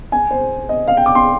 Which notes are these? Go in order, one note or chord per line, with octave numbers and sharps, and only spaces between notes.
G#5
C5
D#5
F5
G5
D6
C6